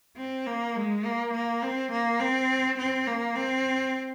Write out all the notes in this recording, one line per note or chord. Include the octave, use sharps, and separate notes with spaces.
C4
A#3
G#3
A#3
A#3
C4
A#3
C4
C4
A#3
C4